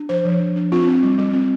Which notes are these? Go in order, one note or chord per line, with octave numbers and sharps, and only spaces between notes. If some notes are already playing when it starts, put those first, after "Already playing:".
Already playing: D4
F3 C5
F3
D4
D4
C4 F4
C4
G3
G3
C4